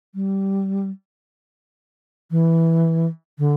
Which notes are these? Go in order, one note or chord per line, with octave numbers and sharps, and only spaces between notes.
G3
E3
D3